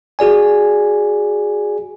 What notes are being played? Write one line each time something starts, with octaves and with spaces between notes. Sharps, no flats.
F#4 G#4 D5 G#5